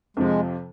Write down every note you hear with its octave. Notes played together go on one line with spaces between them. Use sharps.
F2 C3 F3 G#3